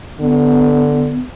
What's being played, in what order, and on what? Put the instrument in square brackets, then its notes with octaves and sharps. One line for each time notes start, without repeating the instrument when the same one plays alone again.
[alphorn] D3 [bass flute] B3